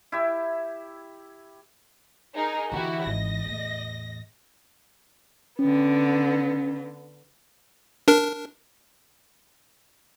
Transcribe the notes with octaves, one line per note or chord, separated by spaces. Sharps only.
E4 G4 E5
D#4 G#4 A#4
D3 E3 E4 F#4 G4
G#1 E3 D#5 A#6
E2 A2
D3 B3 C#4
D4 A#4